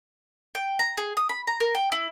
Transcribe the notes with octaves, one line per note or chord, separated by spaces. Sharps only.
G5
A#5
G#4
D#6
B5
A#5
A#4
G5
E4